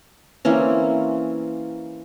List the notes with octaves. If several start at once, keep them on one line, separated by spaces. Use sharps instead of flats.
E3 A#3 C4 C#4